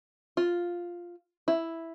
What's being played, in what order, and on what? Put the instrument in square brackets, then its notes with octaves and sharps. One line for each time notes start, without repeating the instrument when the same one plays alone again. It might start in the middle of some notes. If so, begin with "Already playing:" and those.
[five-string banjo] F4
E4